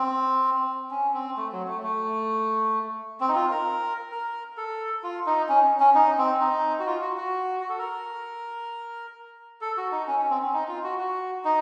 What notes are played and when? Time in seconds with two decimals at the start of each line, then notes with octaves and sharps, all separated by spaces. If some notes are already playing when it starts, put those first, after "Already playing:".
Already playing: C4
0.91 C#4
1.14 C4
1.37 A3
1.52 F#3
1.68 A3
1.83 A3
3.20 C4
3.29 D#4
3.35 F4
3.51 A#4
4.11 A#4
4.57 A4
5.03 F4
5.26 D#4
5.49 C#4
5.80 C#4
5.95 D#4
6.18 C4
6.41 D#4
6.79 F#4
6.87 F4
7.02 F#4
7.17 F#4
7.60 F#4
7.69 A4
7.78 A#4
9.61 A4
9.77 F#4
9.92 D#4
10.07 C#4
10.19 C#4
10.30 C4
10.42 C#4
10.53 D#4
10.68 F4
10.84 F#4
10.99 F#4
11.44 D#4